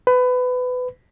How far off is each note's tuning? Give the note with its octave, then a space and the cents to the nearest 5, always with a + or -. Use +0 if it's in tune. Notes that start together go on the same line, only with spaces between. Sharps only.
B4 +25